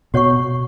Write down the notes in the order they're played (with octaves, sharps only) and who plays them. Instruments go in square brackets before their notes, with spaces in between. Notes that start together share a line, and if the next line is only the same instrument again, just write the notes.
[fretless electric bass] B2 [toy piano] F#4 C#5 F#5 C#6